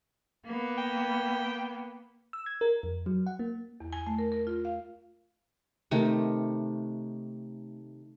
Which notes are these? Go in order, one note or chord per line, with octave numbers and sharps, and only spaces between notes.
A#3 B3
G5
E6
G#6
A#4
F2
F#3
F#5
A#3
E2
G#5
A3
A#4
A#4
F4
F5
C3 D#3 A3